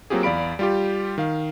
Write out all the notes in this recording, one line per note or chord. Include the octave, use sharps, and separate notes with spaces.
F#3 A#3 C4 F4 G4 G#4
E2 D5 F5 B5 D7
G3 F4 G4
D#3 F5